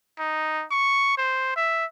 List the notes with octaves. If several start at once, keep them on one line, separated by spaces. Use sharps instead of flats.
D#4
C#6
C5
E5